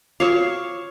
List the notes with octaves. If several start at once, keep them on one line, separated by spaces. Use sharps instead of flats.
F4 F#4 C#5 F5